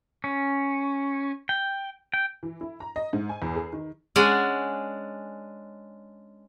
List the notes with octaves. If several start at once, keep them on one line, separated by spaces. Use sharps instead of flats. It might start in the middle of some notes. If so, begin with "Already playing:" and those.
C#4
G5
G5
E3
E4
A#5
D#5
G#2
G#5
E2
G#4
D#3
G#3 C#4 D4 D5 F#5 G#5